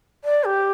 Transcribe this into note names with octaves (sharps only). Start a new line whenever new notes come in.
D5
G4